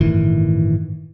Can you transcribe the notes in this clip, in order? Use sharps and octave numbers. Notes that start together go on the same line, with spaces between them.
G1 A2 D#3 E3